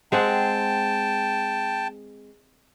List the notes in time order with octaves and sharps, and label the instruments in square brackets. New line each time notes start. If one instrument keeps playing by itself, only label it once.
[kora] G#3 C4 F#5 [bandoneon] G5 A5